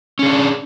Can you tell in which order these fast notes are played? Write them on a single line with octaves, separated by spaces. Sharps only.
C#4 G#4 D4